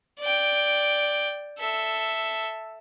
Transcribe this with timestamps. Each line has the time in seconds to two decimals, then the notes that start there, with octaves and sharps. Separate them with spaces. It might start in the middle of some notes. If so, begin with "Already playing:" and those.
0.20 D5 G5
1.59 A4 E5